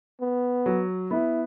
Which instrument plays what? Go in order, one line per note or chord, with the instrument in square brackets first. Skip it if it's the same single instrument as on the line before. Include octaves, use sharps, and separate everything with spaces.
[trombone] B3
[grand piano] F#3
[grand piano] B3 [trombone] E4